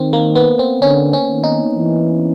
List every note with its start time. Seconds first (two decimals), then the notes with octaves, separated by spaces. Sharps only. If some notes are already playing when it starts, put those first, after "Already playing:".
Already playing: D#3 C4
0.13 A#3
0.35 B3
0.59 C4
0.82 D3 C#4
1.13 C#4
1.28 D#3
1.44 D#4
1.75 E3